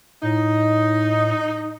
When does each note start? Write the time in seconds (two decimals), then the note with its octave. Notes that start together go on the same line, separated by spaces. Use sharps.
0.23 A2 D#4